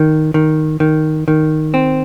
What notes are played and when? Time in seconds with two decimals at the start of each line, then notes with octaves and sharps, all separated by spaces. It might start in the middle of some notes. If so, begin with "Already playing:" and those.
Already playing: D#3
0.34 D#3
0.80 D#3
1.28 D#3
1.74 C4